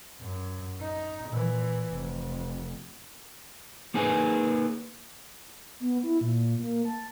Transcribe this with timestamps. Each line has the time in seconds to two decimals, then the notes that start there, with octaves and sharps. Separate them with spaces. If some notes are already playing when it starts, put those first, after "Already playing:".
0.21 F#2
0.81 D#4
1.29 A#2 E3
1.91 F1
3.94 A#3 D#4 G#4 A#4 B4 G#5
5.80 B3
6.03 E4
6.21 A#2
6.60 A#3
6.85 A5